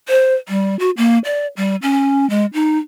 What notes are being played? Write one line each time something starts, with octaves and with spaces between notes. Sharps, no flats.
C5
G3
F#4
A#3
D5
G3
C#4
G#3
D#4